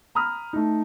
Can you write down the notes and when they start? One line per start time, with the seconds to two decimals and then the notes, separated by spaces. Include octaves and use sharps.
0.15 A#5 B5 D#6 F6
0.53 A3 D#4